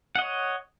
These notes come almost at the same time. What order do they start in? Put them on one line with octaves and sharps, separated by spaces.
F#5 D#5 C#5